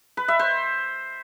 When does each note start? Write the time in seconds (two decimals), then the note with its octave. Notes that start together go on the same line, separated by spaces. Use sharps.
0.17 B4
0.28 E5
0.39 C5